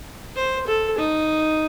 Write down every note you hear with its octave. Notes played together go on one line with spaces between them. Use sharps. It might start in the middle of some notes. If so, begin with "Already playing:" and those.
C5
A4
D#4